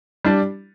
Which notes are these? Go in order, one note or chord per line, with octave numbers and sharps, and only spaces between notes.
G3 D4